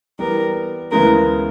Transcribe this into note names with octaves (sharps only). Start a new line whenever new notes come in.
E3 G3 B3 A#4
D2 C#3 E3 G#3 B3 A#4